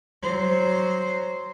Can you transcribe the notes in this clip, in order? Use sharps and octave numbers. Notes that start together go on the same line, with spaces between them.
F#3 C5